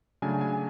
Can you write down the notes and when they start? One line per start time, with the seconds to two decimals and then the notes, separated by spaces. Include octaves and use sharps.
0.22 C#3 F#3 A3 D4 G#5
0.41 G#5